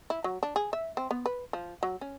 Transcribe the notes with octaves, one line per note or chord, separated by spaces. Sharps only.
E4
F#3
D4
G#4
E5
C4
B3
B4
F3
F#3
C#4